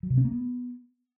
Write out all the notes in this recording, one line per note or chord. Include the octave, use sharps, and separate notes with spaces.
F#3
C3
C4
A#3
B3